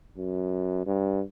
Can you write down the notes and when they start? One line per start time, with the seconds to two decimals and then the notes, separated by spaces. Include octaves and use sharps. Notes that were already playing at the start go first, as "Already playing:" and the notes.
0.18 F#2
0.86 G2